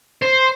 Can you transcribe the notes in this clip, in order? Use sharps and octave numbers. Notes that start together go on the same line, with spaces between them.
C5